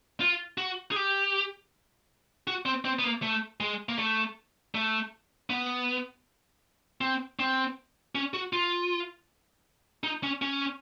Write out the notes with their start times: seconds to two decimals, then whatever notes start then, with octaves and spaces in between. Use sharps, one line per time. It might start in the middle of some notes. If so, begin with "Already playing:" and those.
0.21 F4
0.58 F#4
0.92 G#4
0.96 G4
2.47 F#4
2.66 C4
2.85 C4
2.99 B3
3.04 A#3
3.23 A3
3.61 G#3
3.89 A#3
3.98 A3
4.75 A3
5.50 B3
7.01 C4
7.39 C4
8.15 C#4
8.34 F#4
8.53 F4
10.04 D#4
10.23 C#4
10.42 C#4